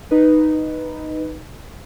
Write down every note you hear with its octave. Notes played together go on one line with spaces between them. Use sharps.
D#4 B4